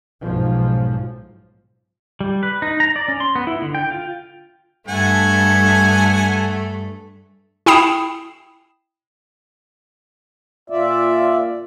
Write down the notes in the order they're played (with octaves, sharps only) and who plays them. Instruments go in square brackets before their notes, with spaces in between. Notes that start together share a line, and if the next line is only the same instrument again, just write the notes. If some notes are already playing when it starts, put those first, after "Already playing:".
[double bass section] B1 G#2 F3
[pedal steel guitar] G3
B4
D#4
A#5
D5
C#4
C6
B3
E4
D3
G5
F4
[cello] G2 [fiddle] A3 A4 [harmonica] F#5 G#5
[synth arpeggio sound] E4 G5 B5 D#6 C7 E7
[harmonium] A#2 D5 E5 [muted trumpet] F4